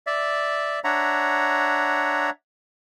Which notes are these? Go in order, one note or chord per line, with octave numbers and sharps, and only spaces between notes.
D5 E5
D4 C#5 E5 F#5 A#5